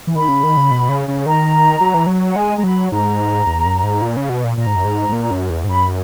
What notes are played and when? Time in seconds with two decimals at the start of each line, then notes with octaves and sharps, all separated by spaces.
0.07 E3
0.15 D#3 B5
0.28 C#3
0.43 D#3
0.57 C#3
0.71 B2
0.89 C#3
1.08 C#3
1.26 D#3 A#5
1.81 F#3
1.94 E3
2.07 F#3
2.30 F#5
2.36 G#3 G#5
2.57 G#3 A#5
2.64 F#3 B5
2.92 G#2 A#5
3.46 E2
3.66 F#2
3.84 G#2
4.02 A#2
4.17 C#3
4.30 B2
4.44 A#2
4.57 A#2 A#5
4.67 G#2
4.76 F#2
4.85 G#2
5.09 G#2
5.12 A#2
5.31 F#2
5.50 E2
5.64 G#2
5.69 F#2 B5